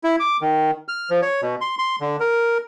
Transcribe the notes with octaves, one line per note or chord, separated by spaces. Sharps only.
E4
D6
D#3
F6
F3
C#5
B2
C6
C6
D3
A#4